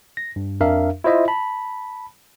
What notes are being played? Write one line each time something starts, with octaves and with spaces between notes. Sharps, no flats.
A#6
G2
F2 D4 A#4 E5 F5
E4 F4 C5 D#5 E5
A5 B5